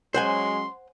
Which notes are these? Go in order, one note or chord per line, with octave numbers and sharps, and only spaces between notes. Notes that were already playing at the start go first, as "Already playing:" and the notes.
F#3 G#3 C#4 C5 F#5 G#5 C6